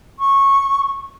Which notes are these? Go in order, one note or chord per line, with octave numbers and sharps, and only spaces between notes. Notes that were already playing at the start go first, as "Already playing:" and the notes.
C#6